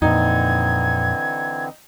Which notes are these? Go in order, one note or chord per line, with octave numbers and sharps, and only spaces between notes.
F2 A#2 D3 E3 C4 D#4 G#6